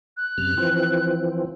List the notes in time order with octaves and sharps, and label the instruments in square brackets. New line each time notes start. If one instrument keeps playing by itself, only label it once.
[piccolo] F#6
[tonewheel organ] F#2 C3 F6
E3 F3 C4